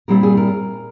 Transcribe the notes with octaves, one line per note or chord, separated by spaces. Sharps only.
A#2 G3 C4 E4 A#4
G#4
A#4